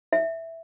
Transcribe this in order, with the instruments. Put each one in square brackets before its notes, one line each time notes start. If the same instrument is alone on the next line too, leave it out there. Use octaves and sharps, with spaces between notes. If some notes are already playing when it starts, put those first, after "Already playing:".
[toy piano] E5